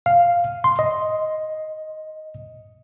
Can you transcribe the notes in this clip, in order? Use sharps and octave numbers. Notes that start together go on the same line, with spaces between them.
F5
C6
D#5